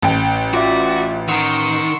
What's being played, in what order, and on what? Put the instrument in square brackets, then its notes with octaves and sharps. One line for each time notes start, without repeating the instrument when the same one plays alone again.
[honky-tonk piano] A1 G5
[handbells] F4 E5 [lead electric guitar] F#4 [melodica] D5
[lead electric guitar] D#3 [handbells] F#5 A#5 [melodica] C6 C#6 E6